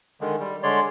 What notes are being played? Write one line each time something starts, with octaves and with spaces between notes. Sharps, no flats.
D3 D#3 G#3
G3
D3 G#3 C#5 D5 C6